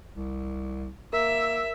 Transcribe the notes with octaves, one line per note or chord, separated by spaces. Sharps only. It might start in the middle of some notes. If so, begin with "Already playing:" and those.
C2
A#3 A#4 E5